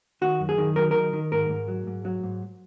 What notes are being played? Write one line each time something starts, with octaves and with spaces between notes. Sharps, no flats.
D#3 F#4
F#2
G#4
D#3
F#3 A#4
D#3 A#4
D#3
G#2 A#4
G#2
F#3
G#2
F#3
G#2